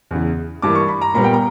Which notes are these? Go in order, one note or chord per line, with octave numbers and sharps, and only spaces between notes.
E2 C#3 E3
G2 E3 A#3 D6
C#6
B5
A#5
A#2 G3 B3 A#5
G5
A#5